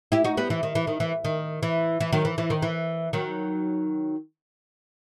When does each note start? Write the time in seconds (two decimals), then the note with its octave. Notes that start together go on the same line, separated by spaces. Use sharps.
0.12 E4 G4
0.24 D#4 F#4
0.37 G3 B3
0.50 E3
0.63 D#3
0.75 E3
0.87 D#3
1.00 E3
1.25 D#3
1.63 E3
2.00 E3
2.13 D#3 F#3
2.25 E3
2.38 E3
2.50 D#3
2.62 E3
3.13 D#3 F#3